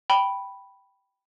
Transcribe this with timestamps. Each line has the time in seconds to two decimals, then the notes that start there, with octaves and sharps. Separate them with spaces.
0.10 G5 B5 G7